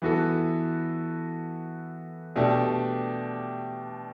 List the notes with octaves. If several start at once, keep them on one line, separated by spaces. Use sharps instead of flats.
E3 B3 F#4 A4
B2 A3 D4 G4